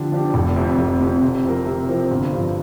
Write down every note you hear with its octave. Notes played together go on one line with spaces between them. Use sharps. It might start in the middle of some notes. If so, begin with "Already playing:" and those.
Already playing: D3 F3 D4 G4
F3 D4 G4
F1
F2 C3
F1
F2 C3
C3
F3 C4 A#4
C3
F3 C4 A#4
G1
G2 F3